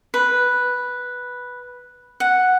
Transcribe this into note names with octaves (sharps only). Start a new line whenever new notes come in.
B4
F#5